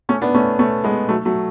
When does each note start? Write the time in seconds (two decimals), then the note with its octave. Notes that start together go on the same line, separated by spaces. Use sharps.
0.09 A3 C#4
0.22 B3 D4
0.34 A3 C#4
0.59 A3 C#4
0.84 G#3 B3
1.09 F#3 A3
1.25 F#3 A3